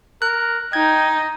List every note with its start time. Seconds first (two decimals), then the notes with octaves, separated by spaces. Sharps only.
0.22 A#4 F#6
0.73 D#4 G5 G#6